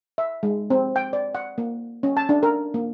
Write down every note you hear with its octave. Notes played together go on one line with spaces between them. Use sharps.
E5
G#3
C4
G5
D5
F#5
A#3
C#4
A5
D4
A#4
A#3